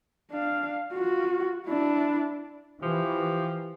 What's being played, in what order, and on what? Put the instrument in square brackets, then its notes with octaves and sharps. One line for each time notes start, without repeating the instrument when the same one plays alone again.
[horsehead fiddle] D4 F5
F4 F#4
D4 E4
[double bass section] E3 [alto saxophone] F3 [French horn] G4